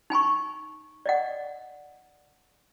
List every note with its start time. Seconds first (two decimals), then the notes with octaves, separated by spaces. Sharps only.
0.10 D#4 G#5 B5 C#6
1.06 D5 D#5 F#5